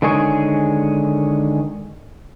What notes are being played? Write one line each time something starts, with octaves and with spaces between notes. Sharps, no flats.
D3 D#3 G#3 G#4 C#5